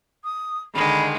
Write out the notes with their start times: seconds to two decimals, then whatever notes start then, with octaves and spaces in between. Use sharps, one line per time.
0.24 D#6
0.75 D3 D#3 G#3 B5